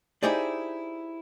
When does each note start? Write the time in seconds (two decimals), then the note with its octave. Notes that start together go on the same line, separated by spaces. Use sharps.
0.23 D#4 E4 G4 G#4 C5 D5